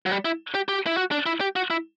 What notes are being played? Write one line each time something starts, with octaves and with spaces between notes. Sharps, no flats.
F#3
G3
E4
G4
G4
E4
F#4
D4
E4
G4
F#4
E4